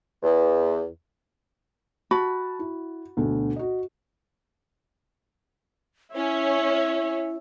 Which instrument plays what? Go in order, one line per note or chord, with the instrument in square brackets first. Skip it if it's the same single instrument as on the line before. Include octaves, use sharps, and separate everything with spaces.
[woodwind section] E2
[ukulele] F#4 B5 [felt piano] A5
[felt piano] E4
D2 B2 D3
F#4 D#5
[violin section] C#4 [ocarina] E4 [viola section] C#5 [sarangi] E5